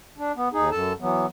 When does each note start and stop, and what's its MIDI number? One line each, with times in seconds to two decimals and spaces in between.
0.18 0.32 62
0.36 0.49 59
0.53 0.70 39
0.53 0.70 63
0.53 0.70 68
0.71 0.93 42
0.71 0.93 69
0.71 0.93 81
1.00 1.26 52
1.00 1.26 54
1.00 1.26 59